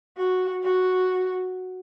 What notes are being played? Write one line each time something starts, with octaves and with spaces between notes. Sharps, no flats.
F#4
F#4